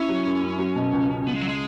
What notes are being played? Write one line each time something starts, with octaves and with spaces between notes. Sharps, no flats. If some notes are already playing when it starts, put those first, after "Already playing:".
Already playing: C#4 E4
F#3
F#2
F#2
F#3
B2
C#2
C#2
C#3 B3
G#3
F#3
G#3